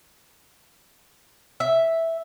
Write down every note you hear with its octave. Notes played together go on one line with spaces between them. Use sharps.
E5